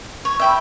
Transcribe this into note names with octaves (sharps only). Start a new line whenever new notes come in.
C#5
E5 G5 B5